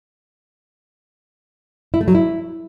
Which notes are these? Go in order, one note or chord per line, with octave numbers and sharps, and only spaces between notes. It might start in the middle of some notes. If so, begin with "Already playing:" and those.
E4
A3
F#3
E4